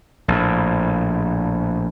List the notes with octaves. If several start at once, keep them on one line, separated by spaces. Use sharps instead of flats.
A#1 A2